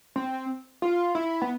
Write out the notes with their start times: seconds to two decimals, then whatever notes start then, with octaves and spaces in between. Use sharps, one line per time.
0.16 C4
0.82 F4
1.15 E4
1.42 B3